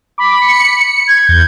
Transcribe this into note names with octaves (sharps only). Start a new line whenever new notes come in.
B5 D6
C#7
G#6
E2 G6